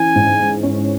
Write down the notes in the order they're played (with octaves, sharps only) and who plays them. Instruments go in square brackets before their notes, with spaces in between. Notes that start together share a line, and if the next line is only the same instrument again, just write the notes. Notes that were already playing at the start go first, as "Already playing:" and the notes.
Already playing: [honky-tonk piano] E3 C#4 [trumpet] G#5
[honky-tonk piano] G#2
G#3
C#4